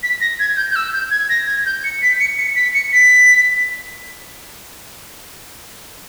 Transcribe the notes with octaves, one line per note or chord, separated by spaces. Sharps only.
B6
A#6
G#6
G6
G6
E6
G6
G#6
A#6
G#6
G6
C#7
B6
C#7
C#7
B6
C#7
B6